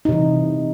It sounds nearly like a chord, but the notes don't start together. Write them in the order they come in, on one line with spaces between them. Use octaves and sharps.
D#4 C3 E3